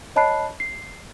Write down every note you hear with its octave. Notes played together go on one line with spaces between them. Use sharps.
C#5 D#5 A5 B5 F#6 C7
C7